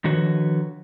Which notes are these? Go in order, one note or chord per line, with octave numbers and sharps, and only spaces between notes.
D3 D#3 F3 F#4 B4 C#5